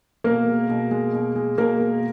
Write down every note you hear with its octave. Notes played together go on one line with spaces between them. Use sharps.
B2 A#3 A#4
G#3
B2
G#3
B2
G#3
B2 A#3 A#4
G#3